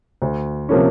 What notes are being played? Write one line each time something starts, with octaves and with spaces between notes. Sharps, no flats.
D2
C3 F3 A#3 C#4